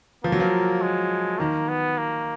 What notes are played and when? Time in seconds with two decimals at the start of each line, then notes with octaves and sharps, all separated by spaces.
0.24 F3 A#3
0.32 F#3
0.40 F3
0.82 G#3
1.39 D#3 A#3
1.68 B3
1.98 A#3